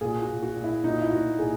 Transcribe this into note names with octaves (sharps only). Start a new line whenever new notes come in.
A#2 G#4
F#4
A#2
F#4
A#2
E4
A#2 D#4
E4
A#2 F#4
A#2 G#4